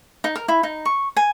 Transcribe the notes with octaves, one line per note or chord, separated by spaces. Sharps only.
D#4
A#4
E4
D#4
C#6
G#5